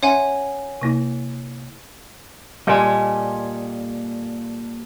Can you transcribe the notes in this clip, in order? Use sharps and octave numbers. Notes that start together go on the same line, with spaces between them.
C#4 C#5 E5 F#5 G#5
C3 A#3 E4
A#2 G3 A#3 A4 D#5 F5 G#5